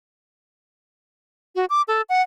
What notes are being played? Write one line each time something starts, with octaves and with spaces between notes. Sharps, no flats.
F#4
D6
A4
F#5